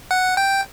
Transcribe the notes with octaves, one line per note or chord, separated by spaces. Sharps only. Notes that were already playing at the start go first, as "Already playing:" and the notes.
F#5
G5